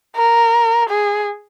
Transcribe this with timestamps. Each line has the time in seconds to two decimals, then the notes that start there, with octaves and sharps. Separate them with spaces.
0.16 A#4
0.90 G#4